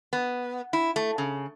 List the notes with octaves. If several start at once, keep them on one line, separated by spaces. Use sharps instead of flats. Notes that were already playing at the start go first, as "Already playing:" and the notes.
B3
E4
A3
C#3